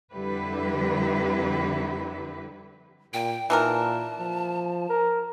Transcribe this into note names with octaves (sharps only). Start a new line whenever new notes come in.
F2 D3 G3 E4 G4 B4
A#2 G5
A#2 E3 D#4 A#4 A5
F3
A#4